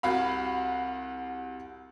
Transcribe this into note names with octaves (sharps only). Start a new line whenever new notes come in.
C2 F#4 F5 B5